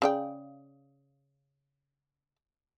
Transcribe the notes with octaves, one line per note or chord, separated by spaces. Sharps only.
C#3 D5 G5